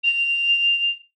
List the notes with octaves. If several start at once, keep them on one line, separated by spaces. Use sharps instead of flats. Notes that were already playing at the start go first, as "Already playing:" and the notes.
F7